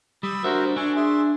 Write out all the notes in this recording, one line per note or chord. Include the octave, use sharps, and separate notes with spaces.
G3 B5 D#6 E6
D4 F#4 A#4 C5 E5
D4 G#5 C#6
G#4 E5 C6